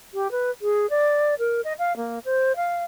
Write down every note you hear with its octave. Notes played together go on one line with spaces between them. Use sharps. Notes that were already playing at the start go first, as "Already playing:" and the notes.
G4
B4
G#4
D5
A#4
D#5
F5
A#3
C5
F5